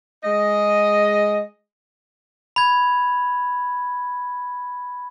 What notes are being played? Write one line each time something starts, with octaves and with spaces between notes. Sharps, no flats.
G#3 D#5
B5 G#6